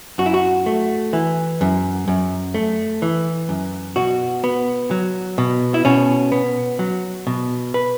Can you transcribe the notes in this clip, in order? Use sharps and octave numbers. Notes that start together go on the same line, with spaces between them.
F#2 F#4
E4
F#4
A3
E3
F#2
F#2
A3
E3
F#2
B2 F#4
B3
F#3
B2
E4
B2 C#4
B3
F#3
B2
B4